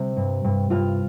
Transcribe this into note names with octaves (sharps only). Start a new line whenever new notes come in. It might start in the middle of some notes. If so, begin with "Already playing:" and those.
Already playing: C3 G3
G2
G2
G2 F4 F5